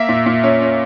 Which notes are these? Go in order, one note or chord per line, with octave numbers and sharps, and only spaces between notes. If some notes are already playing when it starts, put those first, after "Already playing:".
Already playing: A#3 E5
A#2
A#2
C#4
C#4